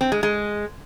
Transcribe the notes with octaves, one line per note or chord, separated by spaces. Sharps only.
C4
G#3
G#3